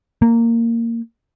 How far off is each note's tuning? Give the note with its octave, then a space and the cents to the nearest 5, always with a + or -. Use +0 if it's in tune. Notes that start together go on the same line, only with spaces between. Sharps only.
A#3 -15